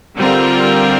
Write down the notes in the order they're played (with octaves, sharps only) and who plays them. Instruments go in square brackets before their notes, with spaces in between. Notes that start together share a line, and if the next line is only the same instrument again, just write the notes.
[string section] D3 G3 C4 F4 A#4